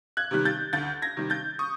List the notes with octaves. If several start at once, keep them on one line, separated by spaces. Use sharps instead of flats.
F#6 G#6
C3 D#3 G3
G6 A6
D2 G6 A6
G#6 A#6
C3 D#3 G3
G6 A6
C#6 D#6